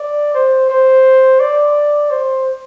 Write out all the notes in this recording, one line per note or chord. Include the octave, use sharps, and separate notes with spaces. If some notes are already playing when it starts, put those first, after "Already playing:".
Already playing: D5
C5
C5
D5
C5